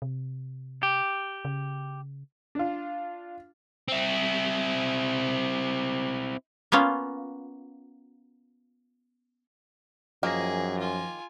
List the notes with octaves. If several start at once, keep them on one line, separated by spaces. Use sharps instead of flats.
C3
G4
C#3
D4 F4
C4 E4
A#3 B3 C#4 F4
F#2 D#3 F3 A#3 G#4 A#6
F4 G#5